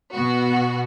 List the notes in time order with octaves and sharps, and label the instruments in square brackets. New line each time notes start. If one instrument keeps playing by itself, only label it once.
[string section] B2 B3 F#4